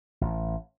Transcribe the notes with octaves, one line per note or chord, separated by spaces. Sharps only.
A1